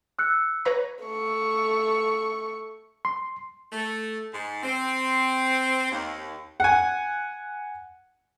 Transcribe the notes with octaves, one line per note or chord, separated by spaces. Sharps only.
E6 F#6 C#7
B4 C#5 A#5
A3 C#6
C6
A3
G#2
C4
D#2
F#5 G#5